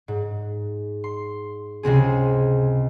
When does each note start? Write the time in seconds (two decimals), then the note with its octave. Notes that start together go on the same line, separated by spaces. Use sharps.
0.08 G#2
1.04 C6
1.83 C#2 C3 C4 G#4